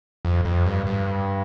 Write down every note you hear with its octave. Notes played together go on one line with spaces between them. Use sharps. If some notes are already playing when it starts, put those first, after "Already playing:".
F2
F2
G2
G2